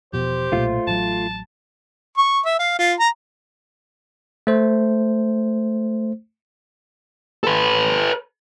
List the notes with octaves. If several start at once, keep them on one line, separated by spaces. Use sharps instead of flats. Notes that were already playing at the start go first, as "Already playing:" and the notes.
E1 B2 F3 G4 C5
B1 A#2 A3 F4
A1 F#3 A5
C#6
E5
F5
F4
A#5
A3 C5
A4 B4